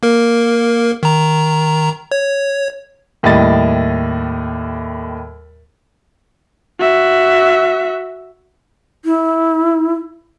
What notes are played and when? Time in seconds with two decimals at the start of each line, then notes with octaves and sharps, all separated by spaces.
0.03 A#3 A#4
1.03 D#3 A#5
2.12 C#5
3.23 D#2 A2 G3 D#5 A6
6.79 F#4 E5
9.05 E4